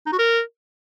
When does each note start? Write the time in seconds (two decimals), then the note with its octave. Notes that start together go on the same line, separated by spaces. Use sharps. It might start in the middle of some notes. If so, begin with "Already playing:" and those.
0.06 D#4
0.13 F#4
0.19 A#4